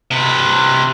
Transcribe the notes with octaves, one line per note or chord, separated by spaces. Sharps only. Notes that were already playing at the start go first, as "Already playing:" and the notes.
C3 B4